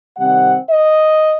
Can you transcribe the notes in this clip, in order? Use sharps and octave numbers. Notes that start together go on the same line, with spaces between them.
C3 D#3 G3 C4 F#5
D#5